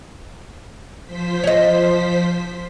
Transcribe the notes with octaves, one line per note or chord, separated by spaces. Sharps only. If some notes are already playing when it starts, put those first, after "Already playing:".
F3 C5 B6
C#5 D#5